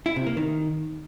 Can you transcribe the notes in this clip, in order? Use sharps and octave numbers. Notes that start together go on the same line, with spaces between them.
E4
C3
A#3
D#3